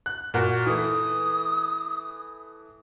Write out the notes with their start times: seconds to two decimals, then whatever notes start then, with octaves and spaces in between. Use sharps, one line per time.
0.06 F#6
0.34 A#2 F#4 A#4
0.66 E3 A3 D#6